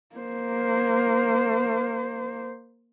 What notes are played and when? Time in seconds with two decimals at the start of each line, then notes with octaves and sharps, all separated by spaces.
0.15 A#3 C5